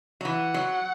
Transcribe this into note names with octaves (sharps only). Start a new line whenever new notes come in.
F#3
E3 F#5
F#3